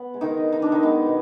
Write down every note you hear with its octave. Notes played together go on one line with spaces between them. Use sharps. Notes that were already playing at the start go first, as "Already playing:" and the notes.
Already playing: B3
G#3
D#3 D#4
D#3
D#4
D#3 D4
D#3 D#4
G#3 B3
B2